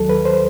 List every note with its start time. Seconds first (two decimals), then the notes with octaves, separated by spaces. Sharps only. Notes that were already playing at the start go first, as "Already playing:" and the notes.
Already playing: D#2 D#3 F#3 A4
0.09 B4
0.25 C5